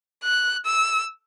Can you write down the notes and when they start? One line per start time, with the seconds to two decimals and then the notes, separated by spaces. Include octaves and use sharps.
0.23 F#6
0.65 E6